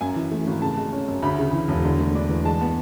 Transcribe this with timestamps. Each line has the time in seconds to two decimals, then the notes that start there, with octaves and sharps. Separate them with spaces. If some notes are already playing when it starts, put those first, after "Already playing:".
0.01 F#2 G#5
0.15 E3
0.32 A3
0.47 G#1
0.61 C#3 A5
0.77 G#3
0.92 C#4
1.08 F#2
1.22 D2 B5
1.39 C#3
1.53 E3
1.68 E1
1.84 D3
1.99 A3
2.15 D4
2.29 E2
2.45 G#3 A5
2.61 B3